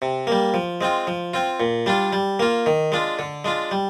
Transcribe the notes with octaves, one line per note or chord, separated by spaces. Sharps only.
C3
G3 A#3
F3
G#3 C4 F4
F3
C4 F4
A#2
G3 D4 F4
G3
A#3 F4
D#3
G#3 D4 F4
D3
G#3 D4 F4
G3